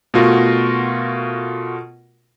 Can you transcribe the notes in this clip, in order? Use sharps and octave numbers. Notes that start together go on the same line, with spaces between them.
B2 A3 F4 F#4 A#4